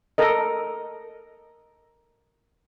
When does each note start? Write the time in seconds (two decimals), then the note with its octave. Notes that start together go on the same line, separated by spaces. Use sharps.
0.18 A4 A#4 D#5